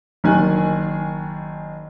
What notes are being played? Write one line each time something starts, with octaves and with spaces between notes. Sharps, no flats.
F#1 D#3 G#5 F#6